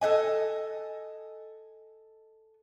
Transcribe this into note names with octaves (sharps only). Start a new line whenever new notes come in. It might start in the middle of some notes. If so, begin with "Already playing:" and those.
A4 C5 D#5 G#5